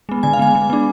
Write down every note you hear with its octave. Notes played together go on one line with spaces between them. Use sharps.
G#3 B3
D3 G#5
F5
G#3 B3 G#5
G#3
B3 D4